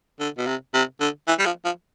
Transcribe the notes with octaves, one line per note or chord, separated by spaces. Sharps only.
D3
B2
C3
C3
D3
E3
G3
F3
F3